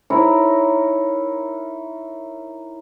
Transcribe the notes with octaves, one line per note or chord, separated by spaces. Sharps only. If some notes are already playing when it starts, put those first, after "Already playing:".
D#4 E4 A#4 C#5